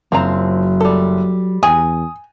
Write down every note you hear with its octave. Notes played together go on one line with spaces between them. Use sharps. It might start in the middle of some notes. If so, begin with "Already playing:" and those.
F#1 F3 F#3 C4 A#5
G3 A4
E2 G#5 D#6